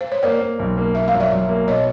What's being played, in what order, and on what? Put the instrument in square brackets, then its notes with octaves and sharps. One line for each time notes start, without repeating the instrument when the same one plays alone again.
[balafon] C5
C#5
[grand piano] A#3 [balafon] C5 D5
[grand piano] A#3
B1
A#3
[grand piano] A#3 [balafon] E5
[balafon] F5
[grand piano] F#3
[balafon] D5 E5
[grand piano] F#3
A#3
[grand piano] B2 [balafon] C#5 D#5